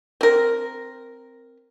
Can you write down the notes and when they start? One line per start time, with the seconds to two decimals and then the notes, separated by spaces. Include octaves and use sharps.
0.21 C4 A#4